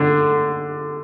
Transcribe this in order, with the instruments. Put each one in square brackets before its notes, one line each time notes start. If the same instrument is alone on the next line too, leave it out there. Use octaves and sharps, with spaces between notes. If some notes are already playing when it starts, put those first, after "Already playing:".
Already playing: [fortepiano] D3